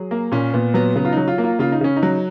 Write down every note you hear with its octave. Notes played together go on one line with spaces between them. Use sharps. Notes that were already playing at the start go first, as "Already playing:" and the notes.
Already playing: F#3 G#4
A#3
A#2 C#4
A#2 B3
F#3 B3
C#3 B3
F4
F#3 D#4
F4
A#3
F4
C#3 F4
D#4
C#3 C#4
D#4
F#3